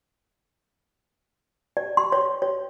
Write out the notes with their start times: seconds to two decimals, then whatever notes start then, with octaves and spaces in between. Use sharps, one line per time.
1.77 D5
1.97 C6
2.12 C#5
2.42 C#5